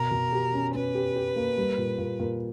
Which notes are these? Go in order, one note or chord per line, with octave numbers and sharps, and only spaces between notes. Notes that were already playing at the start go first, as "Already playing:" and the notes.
Already playing: B2 A#4
B2
G4
C#4
C#4 B4
G4
G4
A#3
G3
A#2
A#2
A#2